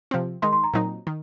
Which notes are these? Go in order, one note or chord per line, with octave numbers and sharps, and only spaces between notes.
C3 F3 C4
D#3 G#3 D#4 C6
C6
A#5
A#2 F#3 C4 D#4
D#3